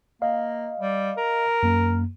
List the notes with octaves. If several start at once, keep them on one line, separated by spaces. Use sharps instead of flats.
A#3 D#5 F5
G3
A#4
F#2 A#3